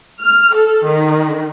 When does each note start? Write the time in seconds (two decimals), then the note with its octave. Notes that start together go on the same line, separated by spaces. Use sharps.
0.21 F6
0.55 A4
0.86 D#3